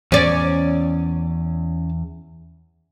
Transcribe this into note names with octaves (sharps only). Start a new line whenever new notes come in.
E2 C#4 D5